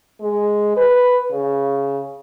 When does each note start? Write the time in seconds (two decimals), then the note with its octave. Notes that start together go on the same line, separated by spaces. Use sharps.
0.21 G#3
0.76 B4
1.32 C#3